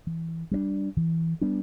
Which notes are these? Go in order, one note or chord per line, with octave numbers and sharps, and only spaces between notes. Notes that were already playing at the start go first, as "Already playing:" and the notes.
E3
G3 B3 D4
E3
G3 B3 D4